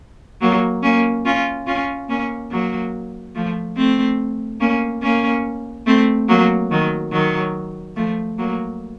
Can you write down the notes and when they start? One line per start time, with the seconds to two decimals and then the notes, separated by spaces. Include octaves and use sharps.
0.41 F#3 A#3
0.83 A#3 C#4
1.25 C#4 F4
1.67 C#4 F4
2.08 A#3 C#4
2.51 F#3 A#3
3.35 F3 A3
3.77 A3 C4
4.60 A#3 C#4
5.02 A#3 C#4
5.86 A3 C4
6.28 F#3 A#3
6.71 D#3 F#3
7.12 D#3 F#3
7.96 F3 A3
8.38 F#3 A#3